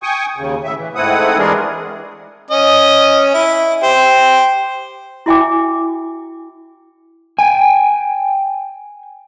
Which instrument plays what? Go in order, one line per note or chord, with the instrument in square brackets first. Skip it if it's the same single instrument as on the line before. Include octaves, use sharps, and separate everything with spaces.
[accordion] G5 G#5 C#6 D#6
D#2 C#3
A2 C#3 E5
E3
G#2 A3 C4 E4 F#5 D#6
E3 G3 G#3 D4 G#4 A#4
[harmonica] C#4 D#5
E4
G4 C5
[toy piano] E4 F#4 E5 G5 G#5 D6
[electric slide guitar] G5 G#5